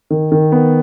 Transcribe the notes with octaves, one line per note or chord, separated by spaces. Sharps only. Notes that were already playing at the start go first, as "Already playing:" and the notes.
D#3
D#3
B3